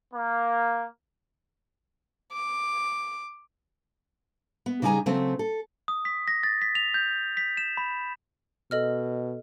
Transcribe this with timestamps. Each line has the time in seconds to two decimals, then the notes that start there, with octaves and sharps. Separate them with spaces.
0.13 A#3
2.33 D6
4.66 B3
4.82 C#3 G3 D#4 G#4 G#5 A#5
5.06 C#3 F#3 A3 C4
5.39 A4
5.88 D#6
6.05 B6
6.28 A#6
6.43 A6
6.62 B6
6.75 F7
6.94 G6
7.37 B6
7.57 E7
7.77 B5
8.71 B2 A4 D#5 F6